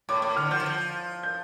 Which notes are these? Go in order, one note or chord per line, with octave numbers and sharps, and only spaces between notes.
A2 D6
A2 D6
D3 F6
F3 G6
D3
F3
G6